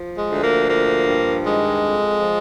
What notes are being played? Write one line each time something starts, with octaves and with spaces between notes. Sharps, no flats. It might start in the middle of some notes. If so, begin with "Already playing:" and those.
Already playing: F3
G#3
D2
A#3
F3 A#3
G2
D#3 G#3
F2
F3